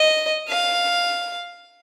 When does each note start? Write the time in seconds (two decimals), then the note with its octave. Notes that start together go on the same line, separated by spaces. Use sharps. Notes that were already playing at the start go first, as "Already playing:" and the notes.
Already playing: D#5
0.48 F5